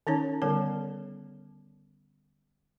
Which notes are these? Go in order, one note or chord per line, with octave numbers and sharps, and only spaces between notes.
D#3 C#4 D#4 C#5
D3 G3 B3 A#4 C#5